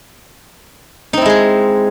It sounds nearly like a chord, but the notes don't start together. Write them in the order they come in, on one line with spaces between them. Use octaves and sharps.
D#4 C4 E4 G#3 G#4